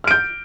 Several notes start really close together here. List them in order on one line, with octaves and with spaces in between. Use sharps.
F6 D7 G6